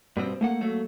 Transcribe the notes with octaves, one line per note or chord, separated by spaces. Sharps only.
G2 B2 C4
A3 A#3 F#5
F#3 A3 A#3